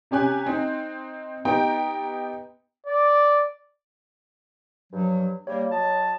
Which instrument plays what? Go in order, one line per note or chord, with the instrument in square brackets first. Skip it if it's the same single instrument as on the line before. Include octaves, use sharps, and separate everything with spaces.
[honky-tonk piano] C3 C#4 G4 G#5 F#6
C4 D#4
B3 D#4 G4 G5 A#5
[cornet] D5
[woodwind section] G2 F3 F#3
[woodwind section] G3 A#3 [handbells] C#5
[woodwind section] F#3 D#5 A5